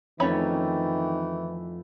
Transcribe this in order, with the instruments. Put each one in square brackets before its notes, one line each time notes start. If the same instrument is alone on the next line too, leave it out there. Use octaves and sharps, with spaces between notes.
[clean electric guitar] F2 A3 [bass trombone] D#3 [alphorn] E3 [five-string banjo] C#4 C#5 B5